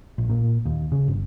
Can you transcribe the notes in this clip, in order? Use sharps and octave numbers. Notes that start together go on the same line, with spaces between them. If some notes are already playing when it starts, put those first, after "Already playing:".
A#1
A#2
D#2
C#3
G1